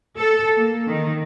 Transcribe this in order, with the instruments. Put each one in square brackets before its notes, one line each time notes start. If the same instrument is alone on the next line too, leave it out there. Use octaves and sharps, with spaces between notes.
[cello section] A4
A#3
D#3